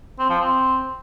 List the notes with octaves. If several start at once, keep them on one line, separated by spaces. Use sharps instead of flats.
C4
F3
C4